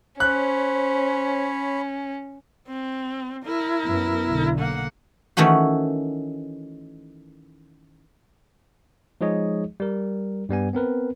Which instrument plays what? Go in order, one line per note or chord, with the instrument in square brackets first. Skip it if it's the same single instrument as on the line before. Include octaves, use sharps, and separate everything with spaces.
[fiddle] C#4 [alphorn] C5 [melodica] C#5 B5 [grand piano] F#6
[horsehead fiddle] C4
E4 A#4
[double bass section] F#2 B3
B1 D3
[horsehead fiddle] A#3 F#5
[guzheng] D#3 E3 A3 C#4 F#4
[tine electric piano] F3 G#3 D#4 G#4 C#5 D#5
G3 A#4
G2 G3 B3 G#5
B3 C4 A#4 B4